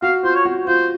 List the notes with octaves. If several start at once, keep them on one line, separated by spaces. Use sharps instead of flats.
F#4 F5
F4 C5
C#5
F#4
F4 C5